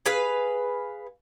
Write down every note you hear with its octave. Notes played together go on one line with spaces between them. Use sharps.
G#4 B4 F5